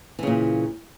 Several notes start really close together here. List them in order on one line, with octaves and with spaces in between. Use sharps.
E3 C#3 A#2